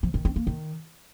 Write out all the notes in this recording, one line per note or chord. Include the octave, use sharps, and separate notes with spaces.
F3
D#3
C4
A#3
D#3